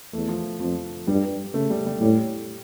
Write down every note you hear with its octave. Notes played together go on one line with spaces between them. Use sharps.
E2 A3
F3
F2 F3
G2 G3
C#3 A3
G3
G3
A2 G3